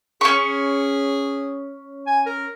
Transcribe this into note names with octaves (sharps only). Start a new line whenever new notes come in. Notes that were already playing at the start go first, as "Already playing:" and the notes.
C#4 G#4 C#6
G#5
A#4